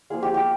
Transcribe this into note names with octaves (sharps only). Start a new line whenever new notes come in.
F3 A#3 F4 G#4
G4
G4